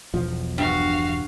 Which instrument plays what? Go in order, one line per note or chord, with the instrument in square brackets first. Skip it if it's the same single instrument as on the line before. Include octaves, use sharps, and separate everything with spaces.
[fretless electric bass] E1 B1 F3
[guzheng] G2 [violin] F#4 F5